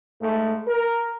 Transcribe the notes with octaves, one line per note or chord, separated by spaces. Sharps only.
G#2 A3
A#4